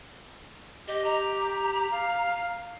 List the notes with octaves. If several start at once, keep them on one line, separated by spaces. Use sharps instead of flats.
G4 D#5
A#5
F5